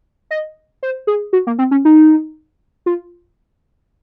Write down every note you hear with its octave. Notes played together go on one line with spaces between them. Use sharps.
D#5
C5
G#4
F#4
A#3
C4
C#4
D#4
F4